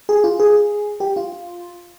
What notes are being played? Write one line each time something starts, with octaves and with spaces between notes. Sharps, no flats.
G#4
F4
G#4
G4
F4